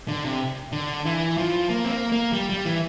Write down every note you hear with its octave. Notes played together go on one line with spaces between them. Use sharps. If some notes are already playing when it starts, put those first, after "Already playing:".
D3
C3
D3
E3
F3
A#3
C4
A#3
A#3
G3
G3
E3